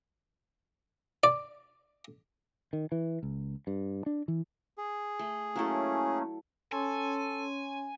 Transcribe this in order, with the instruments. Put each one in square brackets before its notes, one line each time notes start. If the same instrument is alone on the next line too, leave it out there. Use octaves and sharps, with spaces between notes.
[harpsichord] D5
[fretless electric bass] D#3
E3
C#2
G2
D4
E3
[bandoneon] G#4
[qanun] A3
[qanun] F#3 E4 A4 [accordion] A3 A#3 C#4
[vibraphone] C#4 C#5 C6 [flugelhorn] A4 [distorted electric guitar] G#5